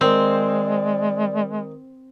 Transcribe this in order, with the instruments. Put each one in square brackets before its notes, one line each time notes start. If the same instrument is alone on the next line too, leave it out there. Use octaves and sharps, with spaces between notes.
[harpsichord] D#3 [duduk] G#3 [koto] C4 [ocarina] D5